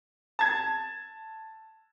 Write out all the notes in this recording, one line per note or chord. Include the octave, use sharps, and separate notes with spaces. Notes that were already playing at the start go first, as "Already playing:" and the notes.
A5 G#6